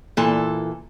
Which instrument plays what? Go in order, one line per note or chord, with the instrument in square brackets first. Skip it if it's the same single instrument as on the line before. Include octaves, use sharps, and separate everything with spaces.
[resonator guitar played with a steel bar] A#2 E3 A4